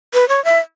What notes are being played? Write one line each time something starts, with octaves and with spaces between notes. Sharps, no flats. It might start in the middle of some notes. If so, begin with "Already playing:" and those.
B4
C#5
E5